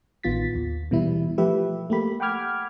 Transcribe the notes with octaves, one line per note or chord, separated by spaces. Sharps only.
A1 D#3 B3 F4 A6 B6
D#2
B2 E3 G3 E4
F3 A3 G4 B4 E5
A3 A#3 G4 B5
F#5 G5 B5 D6 F6 G#6